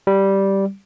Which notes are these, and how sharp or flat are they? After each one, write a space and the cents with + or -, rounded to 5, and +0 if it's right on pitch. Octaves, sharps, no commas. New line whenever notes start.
G3 -5